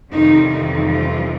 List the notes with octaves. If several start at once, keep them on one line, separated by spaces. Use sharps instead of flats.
F2 C3 D#3 E3 G3 D#4
D#3 D#4
F3 F4